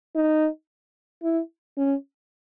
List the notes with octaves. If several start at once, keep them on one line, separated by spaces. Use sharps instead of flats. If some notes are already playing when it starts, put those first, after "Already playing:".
D#4
E4
C#4